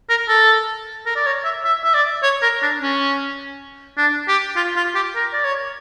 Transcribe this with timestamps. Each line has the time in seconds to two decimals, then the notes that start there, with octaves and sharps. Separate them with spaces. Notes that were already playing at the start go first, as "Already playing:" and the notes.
0.10 A#4
0.29 A4
1.06 A#4
1.16 D5
1.27 C#5
1.45 E5
1.65 E5
1.85 E5
1.94 D5
2.23 C#5
2.43 A#4
2.62 D4
2.82 C#4
3.98 D4
4.28 G4
4.56 F4
4.76 F4
4.95 G4
5.16 A#4
5.33 D5
5.45 C#5